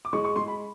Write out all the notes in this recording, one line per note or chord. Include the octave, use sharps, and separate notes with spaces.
D6
G#3 C#6
C#6
G#3 C6
B5